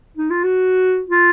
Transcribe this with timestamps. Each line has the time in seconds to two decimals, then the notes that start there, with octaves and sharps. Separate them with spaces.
0.17 D#4
0.30 F4
0.44 F#4
1.08 F4